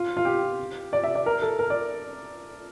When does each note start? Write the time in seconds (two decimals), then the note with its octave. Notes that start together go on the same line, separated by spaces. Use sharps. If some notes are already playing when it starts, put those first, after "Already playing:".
Already playing: F4
0.17 F4
0.25 G4
0.93 D5
1.04 E5
1.15 D5
1.26 A#4
1.42 A4
1.59 A#4
1.70 D5